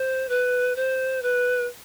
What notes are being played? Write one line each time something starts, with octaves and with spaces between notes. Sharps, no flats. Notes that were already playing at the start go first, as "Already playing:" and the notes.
Already playing: C5
B4
C5
B4